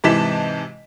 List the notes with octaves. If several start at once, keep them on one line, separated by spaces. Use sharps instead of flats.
G#2 C3 E3 A5 B6 E7